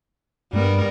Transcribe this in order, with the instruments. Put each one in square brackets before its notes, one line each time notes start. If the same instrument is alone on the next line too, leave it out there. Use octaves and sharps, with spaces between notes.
[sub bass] G2 [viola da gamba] G3 B3 A#4